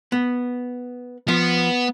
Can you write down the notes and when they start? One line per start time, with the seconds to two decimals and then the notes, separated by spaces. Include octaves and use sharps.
0.12 B3
1.28 F3 B3